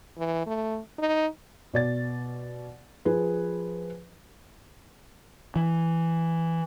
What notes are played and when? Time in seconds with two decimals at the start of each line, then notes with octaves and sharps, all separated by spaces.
0.18 E3
0.47 A3
0.99 D#4
1.74 B2 D5 A6
3.05 F3 G#4 B4
5.56 E3